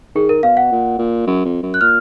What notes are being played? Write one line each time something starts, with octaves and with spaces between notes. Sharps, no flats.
D#3 G#4
A#4
B2 F5
F#5
A#2
A#2
F#2
F2
F#2
F#6
A#2 F6